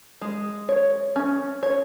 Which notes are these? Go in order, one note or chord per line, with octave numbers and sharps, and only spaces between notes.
G#3
C#5
C#4
C#5